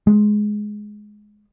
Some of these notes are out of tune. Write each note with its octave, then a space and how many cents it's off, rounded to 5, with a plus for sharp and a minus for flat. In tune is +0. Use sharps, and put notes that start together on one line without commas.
G#3 +10